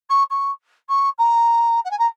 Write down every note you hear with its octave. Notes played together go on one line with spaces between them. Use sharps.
C#6
C#6
C#6
A#5
F#5
G#5
A#5